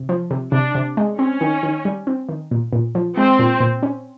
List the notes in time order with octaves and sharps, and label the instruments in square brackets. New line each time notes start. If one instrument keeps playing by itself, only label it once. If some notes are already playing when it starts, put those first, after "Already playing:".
Already playing: [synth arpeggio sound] C3
F3
C3
[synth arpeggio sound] C3 [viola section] D4
[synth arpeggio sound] C3
G#3
[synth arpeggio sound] C4 [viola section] C#4
[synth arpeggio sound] D#3
D#3
G3
C4
D#3
A#2
A#2
F3
[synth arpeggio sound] G#3 [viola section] C4
[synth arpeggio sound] A#2
A#2
C#4